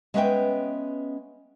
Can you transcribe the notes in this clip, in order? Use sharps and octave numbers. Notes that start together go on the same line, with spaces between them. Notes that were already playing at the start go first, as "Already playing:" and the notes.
G#3 B3 C#4 B4 E5 G5